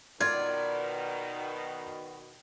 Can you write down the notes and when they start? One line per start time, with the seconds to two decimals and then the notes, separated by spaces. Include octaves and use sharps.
0.21 B2 D#3 F4 D5 G#6